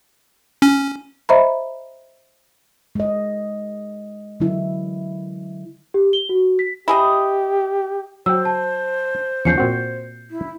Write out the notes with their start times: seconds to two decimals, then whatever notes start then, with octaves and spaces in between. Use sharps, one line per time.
0.62 C#4
1.29 C5 D#5 E5 A#5 B5
2.95 G#3 D#5
4.40 D3 F#3 E4
5.94 G4
6.13 G7
6.29 F#4
6.59 B6
6.88 E4 G4 G#4 D#5
8.26 F#3 C5 G5 E6
8.45 A5
9.45 E2 F3 C#4 G6 C7 C#7
9.58 A#2 C4 F#4
10.30 E4